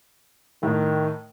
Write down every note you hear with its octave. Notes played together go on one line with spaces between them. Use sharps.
A2 D#3